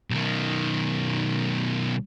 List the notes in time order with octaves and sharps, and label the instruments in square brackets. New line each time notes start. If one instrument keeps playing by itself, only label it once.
[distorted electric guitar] B1 D#3